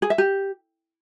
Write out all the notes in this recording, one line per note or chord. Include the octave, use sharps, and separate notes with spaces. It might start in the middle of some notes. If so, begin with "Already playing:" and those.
G#4
E5
G4